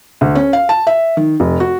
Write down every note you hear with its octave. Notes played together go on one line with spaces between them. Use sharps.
D2
C#4
F5
A5
E5
D#3
F1
F#4